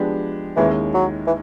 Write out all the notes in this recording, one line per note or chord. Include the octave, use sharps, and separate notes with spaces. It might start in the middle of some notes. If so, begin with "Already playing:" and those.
Already playing: F3 G#3 B3 D4 G4
D#2 D#3 E3 G#3 C#4 E4
F#3
E3